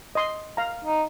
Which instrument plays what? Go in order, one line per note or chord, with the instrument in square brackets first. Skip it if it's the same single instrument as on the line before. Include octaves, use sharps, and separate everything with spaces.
[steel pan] D#5 C6
F5 A#5
[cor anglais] D#4